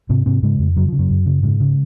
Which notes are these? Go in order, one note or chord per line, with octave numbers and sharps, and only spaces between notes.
G#2 C3 C4
G#2 C3 C4
G#2 C#3 G#3
F2
F#2 C#3 F#3
F3
C#3
F#2 F#3
F#2
C#3
G#2 C#3 G#3
C#3